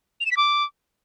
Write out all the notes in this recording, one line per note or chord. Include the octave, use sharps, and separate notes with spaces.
F7
E7
B6
D6